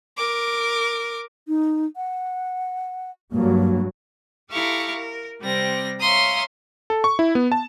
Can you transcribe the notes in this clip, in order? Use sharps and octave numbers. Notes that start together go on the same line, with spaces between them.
A#4 D6
D#4
F#5
G2 F#3 A#3
E4 G4 A4 F5 A#5 C#6
A#4
C3 G3 C4 A#6
C#5 E5 F5 A#5 C6 D#6
A4
C#6
E4
B3
A5